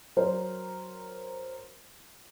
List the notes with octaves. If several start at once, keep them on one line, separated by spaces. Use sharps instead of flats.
F#3 A#4 C5